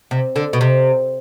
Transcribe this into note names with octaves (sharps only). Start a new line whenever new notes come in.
C3
D3
B2
C3